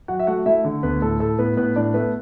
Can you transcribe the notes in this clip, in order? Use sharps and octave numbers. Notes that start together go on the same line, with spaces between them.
F#3 F#4 F#5
E5
A3 F#4 F#5
A3 E4 E5
D3
D2 B3 B4
A2 A4
A2 A4
A2 B3 B4
A2 B3 B4
A2 D4 D5
A3 B3 B4